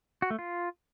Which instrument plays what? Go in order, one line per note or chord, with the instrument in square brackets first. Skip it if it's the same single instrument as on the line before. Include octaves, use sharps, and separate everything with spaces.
[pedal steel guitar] F#4
A3
F4